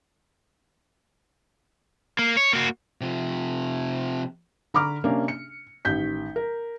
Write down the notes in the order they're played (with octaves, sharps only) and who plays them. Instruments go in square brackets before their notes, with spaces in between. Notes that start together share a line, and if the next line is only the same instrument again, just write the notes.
[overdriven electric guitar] A#3
C#5
A#3 F#4
[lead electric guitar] C3 F3
[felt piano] D3 A#5 B5 C#6 D6 F6
C3 A#3 C#4 D4
C#7
A1 D#3 G6 B6
A#4